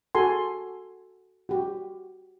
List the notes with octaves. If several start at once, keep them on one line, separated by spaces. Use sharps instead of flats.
F#4 G#4 A4 G#5 A5 C6
F#4 G4